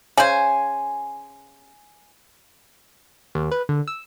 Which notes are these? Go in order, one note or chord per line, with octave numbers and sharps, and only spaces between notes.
C#3 C5 G#5
D#2
B4
D3
E6